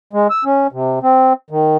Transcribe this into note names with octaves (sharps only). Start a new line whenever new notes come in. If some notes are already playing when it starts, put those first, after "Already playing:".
G#3
E6
C#4
C3
C4
D#3